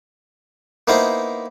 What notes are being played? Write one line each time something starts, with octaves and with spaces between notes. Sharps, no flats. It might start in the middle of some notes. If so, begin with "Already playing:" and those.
A#3 B3 D#4 E4 A#4 C5